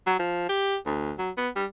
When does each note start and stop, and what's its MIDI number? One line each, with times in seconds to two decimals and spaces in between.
0.07 0.15 54
0.19 0.48 53
0.49 0.76 67
0.85 1.12 38
1.18 1.30 54
1.37 1.49 59
1.56 1.65 55